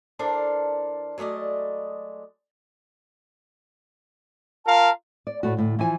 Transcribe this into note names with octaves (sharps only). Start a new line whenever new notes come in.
E3 D4 A4 A#4 C5 D5
F#3 G#3 A3 D5 D#5
F4 A#4 F5 A5
D5
A2 A3 F#4
D2 A2
E3 F3 G#5